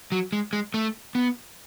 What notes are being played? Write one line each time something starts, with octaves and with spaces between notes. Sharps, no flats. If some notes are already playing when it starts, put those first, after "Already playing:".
F#3
G#3
G#3
A3
B3